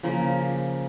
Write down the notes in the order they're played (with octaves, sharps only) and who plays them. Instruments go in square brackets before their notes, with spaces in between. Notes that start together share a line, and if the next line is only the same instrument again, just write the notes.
[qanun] C#3 F3 A#3